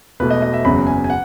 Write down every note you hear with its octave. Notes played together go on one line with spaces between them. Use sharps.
E1 E2 B2 A3 B4
D#5
D#5
E5
F#1 E2 C#3 F#3 C#4 B5
G#5
G#5
F#5